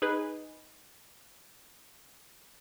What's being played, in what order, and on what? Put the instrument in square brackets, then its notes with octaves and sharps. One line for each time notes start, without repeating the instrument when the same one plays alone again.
[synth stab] D#4 G#4 B4